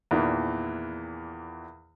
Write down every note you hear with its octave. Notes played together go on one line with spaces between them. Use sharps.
E2 A#2 D#3 E3